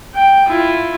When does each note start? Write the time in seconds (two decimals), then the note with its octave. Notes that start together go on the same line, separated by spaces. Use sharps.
0.14 G5
0.47 E4 F4